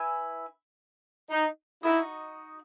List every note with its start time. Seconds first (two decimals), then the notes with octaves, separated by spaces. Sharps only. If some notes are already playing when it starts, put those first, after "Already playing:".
Already playing: E4 B4 E5 G#5
1.31 D#4
1.83 D#4 E4 F#4 B4 D#5